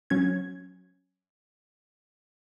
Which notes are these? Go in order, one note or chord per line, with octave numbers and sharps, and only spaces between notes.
F#3 C#4 G#6